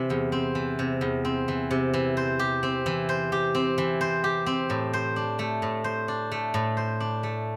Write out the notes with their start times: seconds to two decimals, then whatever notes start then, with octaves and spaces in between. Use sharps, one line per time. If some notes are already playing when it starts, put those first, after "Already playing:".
Already playing: C3 E3
0.10 E2
0.32 C4
0.55 E3
0.79 C3
1.01 E2
1.25 C4
1.48 E3
1.71 C3
1.94 E3
2.17 C5
2.39 G4
2.63 C4
2.86 E3
3.09 C5
3.32 G4
3.55 C4
3.78 E3
4.01 C5
4.24 G4
4.46 C4
4.70 A2
4.93 C5
5.16 D4
5.39 A3
5.62 A2
5.84 C5
6.08 D4
6.32 A3
6.54 A2
6.77 C5
7.00 D4
7.23 A3